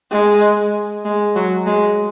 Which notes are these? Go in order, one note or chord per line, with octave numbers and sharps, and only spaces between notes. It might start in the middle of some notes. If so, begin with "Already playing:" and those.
G#3
G#3
F#3
G#3